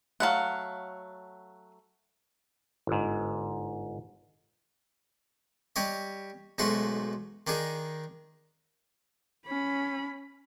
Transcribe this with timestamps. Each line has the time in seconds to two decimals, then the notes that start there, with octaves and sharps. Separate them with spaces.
0.20 F#3 G#3 A3 F5 F#5
2.87 G1 G#2
5.76 G3 G4 C#5 D#5
6.58 B1 G#2 A3 F#4 C6
7.47 D#3 D4 D#4 G#4
9.47 C#4 B5